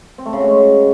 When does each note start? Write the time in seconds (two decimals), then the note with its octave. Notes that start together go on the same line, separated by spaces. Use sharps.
0.18 C4
0.26 A3
0.33 C#3
0.40 F#4
0.48 G#3